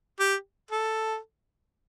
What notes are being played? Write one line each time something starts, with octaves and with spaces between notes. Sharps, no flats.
G4
A4